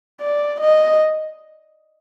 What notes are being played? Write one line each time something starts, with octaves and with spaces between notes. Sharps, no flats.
D5
D#5